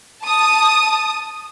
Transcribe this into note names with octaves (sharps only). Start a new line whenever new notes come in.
A5 D#6